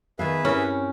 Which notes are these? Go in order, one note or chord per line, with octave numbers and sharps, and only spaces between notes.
D#3 B3 G#4 B4 E5 F5
G2 C4 C#4 E4 A#4 C#5